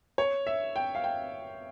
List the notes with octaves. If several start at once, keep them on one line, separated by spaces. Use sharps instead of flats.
C#5
E5
G5
F5
G5